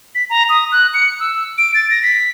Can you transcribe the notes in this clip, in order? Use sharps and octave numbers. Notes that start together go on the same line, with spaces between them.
B6
A#5
D#6
F#6
C#7
E6
D7
A6
A#6
B6